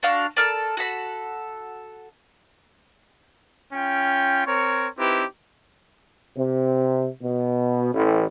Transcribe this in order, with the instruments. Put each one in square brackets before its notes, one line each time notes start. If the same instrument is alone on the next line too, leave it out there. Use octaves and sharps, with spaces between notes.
[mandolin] D4 F#4 F5
A4 A#4 D5
F#4 A4 B5
[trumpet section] C#4 F4 G5
C4 A#4 C#5
C4 D#4 E4 G4 B4
[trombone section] C3
B2
A1